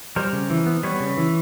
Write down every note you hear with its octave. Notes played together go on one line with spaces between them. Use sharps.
G3 A#4 C5
C#3
E3
B3
G3 B4 C#5
C#3
E3